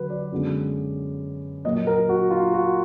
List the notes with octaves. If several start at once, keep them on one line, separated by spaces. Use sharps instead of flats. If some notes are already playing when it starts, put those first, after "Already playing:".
Already playing: D3 F#3 B4
D5
F#2 D3 G#3 B3
A#2 F#3 A#3 D#5
A#4
F#4
F4
F#4